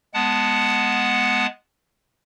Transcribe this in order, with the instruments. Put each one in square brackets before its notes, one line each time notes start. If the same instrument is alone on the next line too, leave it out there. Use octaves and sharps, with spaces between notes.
[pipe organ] G#3 B3 F#5 A5